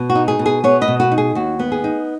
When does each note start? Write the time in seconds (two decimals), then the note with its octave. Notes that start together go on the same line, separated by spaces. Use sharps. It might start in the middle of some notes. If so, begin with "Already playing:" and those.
Already playing: B2
0.10 F#4
0.15 D#4
0.28 G#4
0.39 B2
0.46 G#4
0.64 B3 G#4 C#5
0.81 B4 D#5
0.88 B2
1.00 F#4 B4
1.12 D#4
1.18 G#4
1.35 D#2 F#4
1.59 B3
1.72 G#4
1.84 D#4